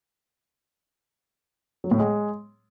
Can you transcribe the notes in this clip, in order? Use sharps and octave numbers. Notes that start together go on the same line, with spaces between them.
F#3
A2
G#3